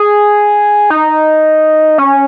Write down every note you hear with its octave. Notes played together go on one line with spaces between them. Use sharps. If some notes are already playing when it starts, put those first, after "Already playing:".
Already playing: G#4
D#4
C#4